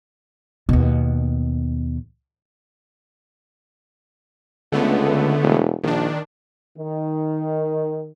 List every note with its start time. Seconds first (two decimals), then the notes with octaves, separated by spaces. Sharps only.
0.69 D#2 B2
4.72 C#2 D3 A3 B3
5.43 E1
5.84 A#1 D#3 D4
6.78 D#3